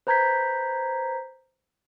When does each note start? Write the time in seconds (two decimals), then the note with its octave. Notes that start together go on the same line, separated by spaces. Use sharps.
0.07 B4 C5 A#5 G6 G#6 B6